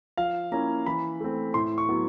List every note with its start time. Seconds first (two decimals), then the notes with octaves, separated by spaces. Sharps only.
0.17 F3 F5
0.52 A#3 C#4 E4 A#5
0.86 E3 B5
1.20 A3 C4
1.54 A2 C6
1.78 C#6
1.89 F#3 B3 E4